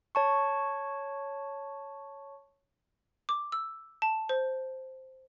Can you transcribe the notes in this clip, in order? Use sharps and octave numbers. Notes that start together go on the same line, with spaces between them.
C#5 A5 C#6
D6
E6
A5
C5